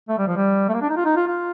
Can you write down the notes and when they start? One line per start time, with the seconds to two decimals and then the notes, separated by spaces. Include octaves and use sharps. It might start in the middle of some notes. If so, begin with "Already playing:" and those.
0.09 A3
0.18 G3
0.28 F3
0.37 G3
0.69 A3
0.74 A#3
0.82 D4
0.90 D#4
0.97 F4
1.05 D#4
1.16 F4
1.27 F4